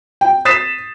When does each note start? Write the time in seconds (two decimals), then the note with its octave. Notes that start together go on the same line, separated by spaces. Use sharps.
0.21 G5
0.45 D#6 A6 B6 C7 E7